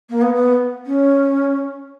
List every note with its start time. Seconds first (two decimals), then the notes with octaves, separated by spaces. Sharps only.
0.10 A#3
0.22 B3
0.34 B3
0.86 C#4